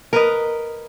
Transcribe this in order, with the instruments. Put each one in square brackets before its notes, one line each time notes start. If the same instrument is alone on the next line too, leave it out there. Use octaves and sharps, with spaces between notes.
[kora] A#4 B4 D#5